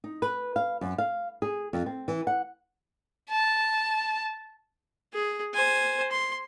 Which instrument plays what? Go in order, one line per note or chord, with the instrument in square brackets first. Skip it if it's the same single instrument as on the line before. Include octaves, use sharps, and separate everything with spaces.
[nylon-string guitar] D#4
B4
F5
F#2
F5
G#4
F2
C4
E3
F#5
[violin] A5
[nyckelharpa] G#4
C5 G#5
C6